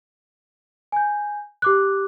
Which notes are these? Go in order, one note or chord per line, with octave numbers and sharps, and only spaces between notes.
G#5 G6
G4 D6 F#6